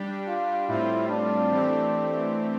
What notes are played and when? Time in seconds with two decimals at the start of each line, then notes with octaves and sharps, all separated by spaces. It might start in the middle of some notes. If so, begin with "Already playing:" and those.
Already playing: G3 D4 G4
0.28 F4
0.68 A2 G3 C4 E4 F4
1.09 D4
1.51 E3 A3 C4 G4